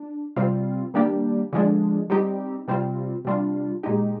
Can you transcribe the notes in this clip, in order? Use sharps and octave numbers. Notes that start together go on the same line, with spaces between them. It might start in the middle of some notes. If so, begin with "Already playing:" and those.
Already playing: D4
C3 G3 C4 F4
D#3 G3 A#3 D4 G4
D3 F3 G#3 D4
G3 C4 D#4 G4
C3 G3 C4 F4
C3 G3 D4 F4
A#2 G#3 D#4 G4